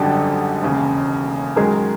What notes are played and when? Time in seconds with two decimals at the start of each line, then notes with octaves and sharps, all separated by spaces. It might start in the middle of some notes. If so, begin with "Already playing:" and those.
Already playing: G#1 F#2 D3 G3 G4 A4
0.62 E1 D#2 C#3
1.56 F#2 D#3 G#3 G#4 A#4